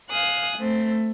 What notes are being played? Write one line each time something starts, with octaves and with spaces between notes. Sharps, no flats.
F5 G#5 D#6 F#6
A3 C4